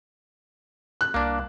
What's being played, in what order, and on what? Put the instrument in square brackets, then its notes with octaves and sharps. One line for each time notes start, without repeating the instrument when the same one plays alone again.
[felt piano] F#6
[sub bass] C2 [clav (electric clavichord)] A#3 D4